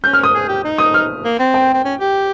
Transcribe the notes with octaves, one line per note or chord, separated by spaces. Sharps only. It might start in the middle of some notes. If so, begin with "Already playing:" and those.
C#4 G6
F6
D#6
G#4
G4
D#4
D#6
F6
A#3
C4
G5
C4
C#4
G4